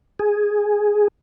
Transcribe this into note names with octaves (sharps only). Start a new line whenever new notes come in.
G#4